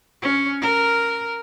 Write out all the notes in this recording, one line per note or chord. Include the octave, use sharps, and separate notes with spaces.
C#4
A#4